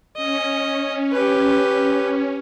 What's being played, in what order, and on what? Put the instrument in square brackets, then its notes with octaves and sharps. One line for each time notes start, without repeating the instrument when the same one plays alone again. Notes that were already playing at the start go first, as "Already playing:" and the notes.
[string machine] C#4 [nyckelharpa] D#5
[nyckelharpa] G4 B4